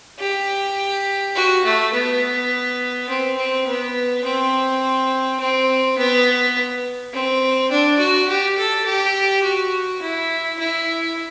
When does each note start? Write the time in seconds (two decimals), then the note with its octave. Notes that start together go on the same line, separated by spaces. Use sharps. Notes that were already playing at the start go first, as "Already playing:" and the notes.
0.19 G4
1.35 F#4
1.65 A3
1.93 B3
3.09 C4
3.37 C4
3.66 B3
4.24 C4
5.40 C4
5.98 B3
7.13 C4
7.71 D4
7.99 F#4
8.28 G4
8.58 A4
8.86 G4
9.43 F#4
10.02 E4
10.59 E4